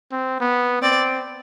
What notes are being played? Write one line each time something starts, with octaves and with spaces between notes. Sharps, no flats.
C4
B3
C4 D5